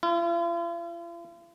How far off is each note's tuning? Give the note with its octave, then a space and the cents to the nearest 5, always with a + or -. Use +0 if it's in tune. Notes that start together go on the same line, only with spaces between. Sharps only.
F4 -45